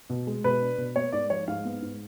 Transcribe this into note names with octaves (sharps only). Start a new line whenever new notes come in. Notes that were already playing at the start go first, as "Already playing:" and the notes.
B2
G#3
B2 B4
D4
B2
B3 C#5
G#2 D5
F3 C#5
G#2 F5
B3
G#2